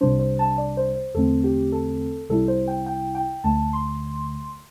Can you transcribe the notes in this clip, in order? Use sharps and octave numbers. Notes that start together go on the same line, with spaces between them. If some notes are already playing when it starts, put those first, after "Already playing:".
C2 C3 G3 D4 C5
C5
A5
D5
C5
C5
E2 D3 A3 C4 A4
G4
A4
C2 C3 G3 E4 A4
C5
G5
G5
G5
D2 D3 A3 A5
C6